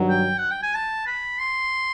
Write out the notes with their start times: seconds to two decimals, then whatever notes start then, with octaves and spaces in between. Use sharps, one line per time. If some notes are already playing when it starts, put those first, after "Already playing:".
Already playing: G2 D#3 F#3
0.09 G5
0.38 F#5
0.51 G5
0.63 G#5
0.74 A5
1.06 B5
1.39 C6